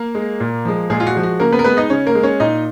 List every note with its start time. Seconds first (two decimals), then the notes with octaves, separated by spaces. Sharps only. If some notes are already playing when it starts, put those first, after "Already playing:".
Already playing: A#3 A#4
0.15 G#3
0.40 A#2
0.65 F3 G#3
0.90 A#2 G#3 G#4
1.00 F4
1.07 F#4
1.14 F3 G#3
1.23 F#4
1.40 C#3 A#3 A#4
1.52 B3 B4
1.59 A#4
1.64 G#3 B3 B4
1.77 D#4 D#5
1.90 C#3 C#4 C#5
2.06 A#3 A#4
2.15 G#3
2.23 C#4 C#5
2.40 A#2 D#4 D#5